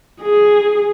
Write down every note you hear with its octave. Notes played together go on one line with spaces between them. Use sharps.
G#4